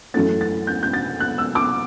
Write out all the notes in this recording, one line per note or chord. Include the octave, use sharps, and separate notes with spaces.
F#2 E3 A3 C#4 A6
A6
G6
G6
A6
F#6
E6
D6